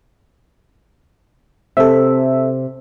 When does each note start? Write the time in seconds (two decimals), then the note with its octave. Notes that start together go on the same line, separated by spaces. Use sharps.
1.77 C3 C4 A4 E5